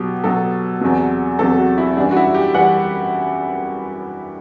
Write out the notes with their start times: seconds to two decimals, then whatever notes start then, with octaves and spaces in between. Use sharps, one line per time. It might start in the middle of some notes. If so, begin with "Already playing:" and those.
Already playing: B2 F#3 G4
0.24 B2 F#3 A4
0.81 E2 C3 F#3
1.39 E2 C3 F#3 A4
1.58 F#4
1.78 E4
1.97 F#2 E3 G3 D4
2.11 F#4
2.16 E4
2.34 G4
2.54 E3 G3 F#5